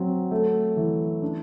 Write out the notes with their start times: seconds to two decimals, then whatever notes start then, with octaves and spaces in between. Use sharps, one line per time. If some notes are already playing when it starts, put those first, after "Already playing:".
Already playing: F#3 C4
0.31 A3
0.76 E3
1.22 D4